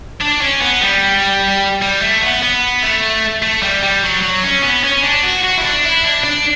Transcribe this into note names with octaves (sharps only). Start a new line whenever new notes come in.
D4
C#4
B3
G3
G3
A3
B3
B3
A3
A3
G3
G3
F#3
F#3
C#4
B3
C#4
D4
F#4
F#4
E4
D4
E4
D4
D4